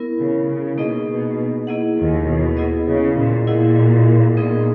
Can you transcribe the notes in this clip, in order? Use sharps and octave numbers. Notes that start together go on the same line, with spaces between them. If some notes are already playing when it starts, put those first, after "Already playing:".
Already playing: B3 E4 A#4
C#3
C#3
B2 A#3 D#4 G#4 D#5
B2
A#3 E4 G#4 D#5 F#5
D#2 D#3
B2
B3 E4 G#4 D#5
C#3
A#2
A#2 E4 G#4 D#5 F#5
A#2 B3 D#4 G#4 D#5